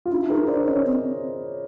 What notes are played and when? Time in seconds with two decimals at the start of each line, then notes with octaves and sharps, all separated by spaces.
0.06 F4
0.11 D4 E4
0.21 D4
0.29 D#4 G#4 A#4
0.48 D4 C5 D5
0.66 C#4 C#5 D#5
0.86 C4